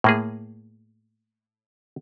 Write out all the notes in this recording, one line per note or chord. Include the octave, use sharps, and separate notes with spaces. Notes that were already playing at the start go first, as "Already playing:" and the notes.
A2 A#3 G#4